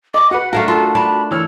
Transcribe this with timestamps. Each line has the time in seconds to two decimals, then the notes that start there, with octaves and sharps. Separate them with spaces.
0.14 D#5 C#6 D6
0.31 F#4 B4 F#5
0.53 A3 D4 F#4 A#4 F5
0.68 F4 A4 A5
0.95 D4 B5
1.31 E3 C#5 E6 F6